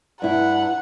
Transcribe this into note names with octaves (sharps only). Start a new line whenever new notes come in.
G2 E4 F#5